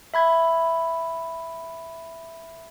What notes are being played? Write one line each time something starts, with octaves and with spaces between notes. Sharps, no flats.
E5 B5 G#6